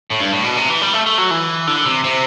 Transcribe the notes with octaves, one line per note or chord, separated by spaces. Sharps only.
A2
G2
A2
B2
C3
E3
G3
A3
A3
F#3
E3
D3
C3
C3